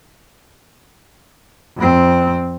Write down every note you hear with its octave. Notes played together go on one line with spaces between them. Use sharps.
F2 C4